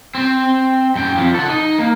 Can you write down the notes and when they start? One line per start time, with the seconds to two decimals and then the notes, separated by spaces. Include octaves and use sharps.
0.15 C4 C5
0.96 F#2 G5
1.17 F2 F3
1.35 A4 F#5
1.49 D#4
1.78 A#3